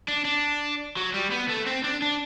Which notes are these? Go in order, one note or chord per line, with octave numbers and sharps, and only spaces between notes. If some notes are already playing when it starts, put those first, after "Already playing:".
D4
D4
F#3
G3
B3
A3
C4
D4
D4